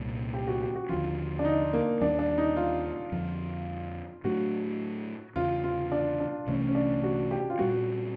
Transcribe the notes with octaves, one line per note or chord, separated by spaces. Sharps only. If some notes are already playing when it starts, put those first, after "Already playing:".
Already playing: C2 A#2 G3
G4
F#4
G4
F#4
D#2 D3 F3 F4
D4
D#4
A#3
D#2 D#3 G3 D4
D4
D#4
F4
F2 D3 F3
A2 F#3 A3 D4 F#4
E2 C#3 E3 F4
F4
D4
D4
C2 C3 E3 A3 C#4
C#4
D4
F#4
G4
F4
A#2 G3 C4 F#4